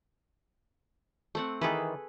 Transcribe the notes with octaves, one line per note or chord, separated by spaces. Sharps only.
A3 C4 F#5
D#3 E3 G#4 A4 B4